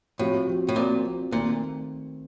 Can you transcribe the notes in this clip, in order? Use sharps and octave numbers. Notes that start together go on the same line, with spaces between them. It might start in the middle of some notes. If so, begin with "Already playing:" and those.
A2 F3 C4 F#4
F3 C4 F#4
A2
A#2 F3 C4 F#4
F3 C4 F#4
A#2 D#3 A3 C4